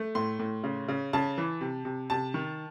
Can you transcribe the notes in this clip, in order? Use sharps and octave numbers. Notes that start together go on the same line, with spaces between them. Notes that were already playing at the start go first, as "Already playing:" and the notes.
Already playing: A3
A2 C6
A2
C#3
C#3
C#3 A5
E3
C3
C3
C3 A5
D#3